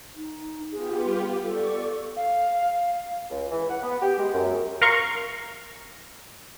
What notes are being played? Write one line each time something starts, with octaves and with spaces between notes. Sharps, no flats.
D#4
B3 F4 G4 G#4
G3
A4 D5 C#6
F5
C#2
E3
F#5
B3
G4
G#3
F#2
A#4 F5 A#5 C6 C#6